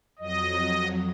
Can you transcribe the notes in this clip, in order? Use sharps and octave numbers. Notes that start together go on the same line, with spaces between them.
F2 F#3 D#5